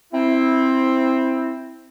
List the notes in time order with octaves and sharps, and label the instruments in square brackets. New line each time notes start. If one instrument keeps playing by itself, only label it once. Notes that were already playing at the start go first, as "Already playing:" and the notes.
[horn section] C4 E4